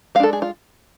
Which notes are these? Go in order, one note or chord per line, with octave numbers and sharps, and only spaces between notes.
G#3 D4 A4 F5
G#4
F4